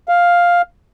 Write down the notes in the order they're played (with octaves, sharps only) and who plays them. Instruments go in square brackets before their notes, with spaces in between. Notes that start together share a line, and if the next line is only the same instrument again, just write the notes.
[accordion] F5